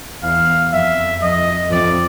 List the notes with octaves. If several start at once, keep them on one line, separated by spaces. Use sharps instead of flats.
E2 F5
F2 E5
F2 D#5
F2 D5